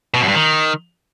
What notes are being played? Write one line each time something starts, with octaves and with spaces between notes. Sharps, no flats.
B2
F#2
G2
D#3